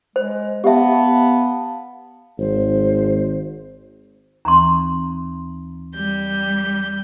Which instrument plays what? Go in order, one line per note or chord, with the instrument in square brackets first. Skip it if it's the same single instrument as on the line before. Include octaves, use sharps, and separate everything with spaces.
[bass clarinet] G#3 [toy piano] C5
[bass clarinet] B3 [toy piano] G4 E5 [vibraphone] F5 A5
[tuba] G#1 [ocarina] C5
[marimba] D#2 E3 C4 [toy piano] A#5 C6
[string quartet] G3 G6